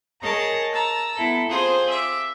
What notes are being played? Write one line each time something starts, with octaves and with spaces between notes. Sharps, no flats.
G#4 A#4 C#5 D#5 A5 A#5
A5 A#5 E6
B3 E4 A4
C4 F4 G#4 C5
E5 D6